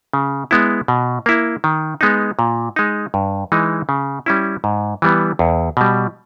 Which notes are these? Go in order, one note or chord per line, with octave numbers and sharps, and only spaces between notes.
C#3
G#3 B3 E4
B2
A#3 E4
D#3
G#3 B3 D#4
A#2
G#3 D#4
G2
E3 G#3 D#4
C#3
G3 C#4 E4
G#2
E3 G3 B3
E2
B2 G3